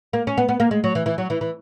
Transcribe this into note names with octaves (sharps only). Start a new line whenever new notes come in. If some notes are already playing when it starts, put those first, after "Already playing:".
A#3
C#4
B3
B3
A#3
G#3
F#3
E3
E3
F#3
E3
E3